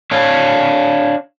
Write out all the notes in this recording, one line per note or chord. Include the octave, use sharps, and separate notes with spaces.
D4 C#5 F5